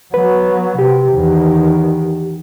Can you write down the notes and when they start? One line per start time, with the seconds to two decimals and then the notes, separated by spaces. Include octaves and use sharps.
0.14 F#3 B3 B4
0.79 C3 G4
1.13 E2 D#3